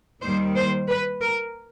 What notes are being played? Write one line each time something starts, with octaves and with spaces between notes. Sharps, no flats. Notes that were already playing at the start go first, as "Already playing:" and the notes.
D#2 D#3 G3 C5
C5
B4
A#4